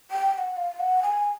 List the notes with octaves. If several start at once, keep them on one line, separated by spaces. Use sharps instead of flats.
G5
G5
F#5
F5
F#5
G#5